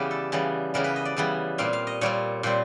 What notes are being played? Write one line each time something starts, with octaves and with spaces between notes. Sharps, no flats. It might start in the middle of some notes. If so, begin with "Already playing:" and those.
Already playing: C#3 E3 G3 B3 G4
A4
C#3 E3 G3 B3
C#3 E3 G3 B3 A#4
B4
D#5
D5
C#3 E3 G3 B3
A#2 G3 C4 F5
F5
D#5
A#2 G3 C4 C#5
A#2 G3 C4 C5